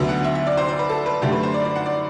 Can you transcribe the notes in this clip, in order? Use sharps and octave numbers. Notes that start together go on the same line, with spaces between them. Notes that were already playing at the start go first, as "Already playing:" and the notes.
Already playing: D2 D3 F#3 B3 E5
F#5
E5
E5
D5
C5
C5
B4
A4
B4
F#2 D3 A3 G4
B4
C5
D5
D5
F#5
D5